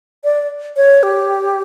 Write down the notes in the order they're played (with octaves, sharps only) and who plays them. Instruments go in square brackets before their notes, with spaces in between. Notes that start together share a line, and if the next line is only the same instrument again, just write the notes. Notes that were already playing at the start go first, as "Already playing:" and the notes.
[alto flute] D5
C#5
G4